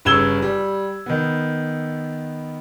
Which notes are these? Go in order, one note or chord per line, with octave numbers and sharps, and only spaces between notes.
G1 C#3 E6 G#6 E7 G7
G3
D#3 B3